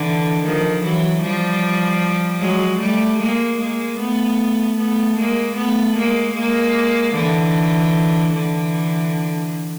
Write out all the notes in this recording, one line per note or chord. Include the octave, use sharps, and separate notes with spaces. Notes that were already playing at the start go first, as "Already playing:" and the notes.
Already playing: D3 E3
D#3 F3
E3 F#3
F3 G3
F#3 G#3
G3 A3
G#3 A#3
G#3 A#3
A3 B3
A3 B3
G#3 A#3
A3 B3
G#3 A#3
G#3 A#3
D3 E3
D3 E3